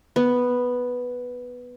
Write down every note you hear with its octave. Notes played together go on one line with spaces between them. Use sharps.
B3